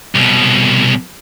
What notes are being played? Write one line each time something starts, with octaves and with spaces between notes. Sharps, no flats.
C2 B2